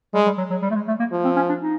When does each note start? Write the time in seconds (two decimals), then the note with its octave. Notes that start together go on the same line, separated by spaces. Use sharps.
0.14 G3 G#3
0.26 G3
0.37 F#3
0.50 F#3
0.62 G3
0.70 A3
0.75 G#3
0.88 A3
0.99 A#3
1.12 F3
1.25 C4
1.36 C#4
1.49 D4
1.61 D#4